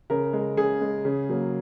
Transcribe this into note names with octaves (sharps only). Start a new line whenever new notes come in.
C#3 A#4
G#3
C#3 G#4
G#3
C#3
F#3 A#3